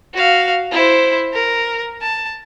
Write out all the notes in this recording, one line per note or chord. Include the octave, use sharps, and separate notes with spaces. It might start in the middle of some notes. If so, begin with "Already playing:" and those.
F#4 F5
E4 C5
A#4
A5